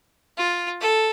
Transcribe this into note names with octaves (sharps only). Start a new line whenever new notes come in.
F4
A4